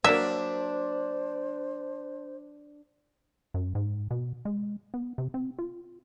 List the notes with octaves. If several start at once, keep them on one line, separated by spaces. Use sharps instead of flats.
F#3 A#3 D4 C5 E5
F#2
G#2
B2
G#3
B3
C3
C4
F4